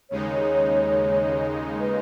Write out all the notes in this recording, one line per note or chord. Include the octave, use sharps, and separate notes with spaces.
D#2 C#3 G#3 D#4 C#5
B4